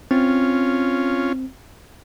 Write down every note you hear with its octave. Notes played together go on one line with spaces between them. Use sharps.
C4 C#4 F4